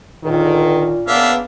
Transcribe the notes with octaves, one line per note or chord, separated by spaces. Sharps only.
C#2 A#2 D3 D#3
C#3 E3 A#3 B3 D4 E5 F5